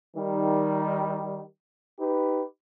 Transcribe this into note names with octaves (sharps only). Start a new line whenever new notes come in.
D#3 G3
D#4 G4 B4